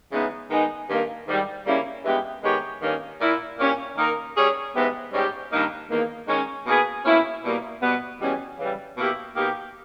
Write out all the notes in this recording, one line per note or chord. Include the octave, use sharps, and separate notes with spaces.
C#3 E3 G#3 B3 D#4
D#3 G#3 B3 D#4 G#4
G2 D#3 A#3
G#2 D#3 G3
C#3 G3 A#3 C#4 E4
G2 E3 G#3 B3 G4
D#3 G#3 B3 G4 C#5
G2 D#3 A#3 C#4
A#2 A#3 E4
A#2 A#3 C#4 G4
D#3 A#3 D#4 A#4
G3 C#4 G#4 C#5
G#2 E3 G#3 B3 G4
G#2 G3 C#4 G4
G2 D#3 A#3 D#4
E2 D#3 A#3
D#3 G#3 C#4
B2 A#3 D#4 G#4 B4
B2 A#3 C#4 E4
B2 G3 A#3
B2 G3 B3
E2 B2 G3 C#4
C#3 E3 G3
B2 A#3 E4 G4
B2 A#3 D#4 G4